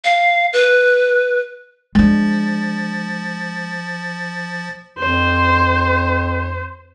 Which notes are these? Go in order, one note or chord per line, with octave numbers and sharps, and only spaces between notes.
F5
B4
F3 G#3 D4 A6
F2 C5